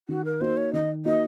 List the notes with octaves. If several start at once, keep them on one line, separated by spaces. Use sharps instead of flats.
D#3 F#4
A#4
A#3 D#4 F#4 C5
C#5
D#3 D#5
A#3 D#4 F#4 D#5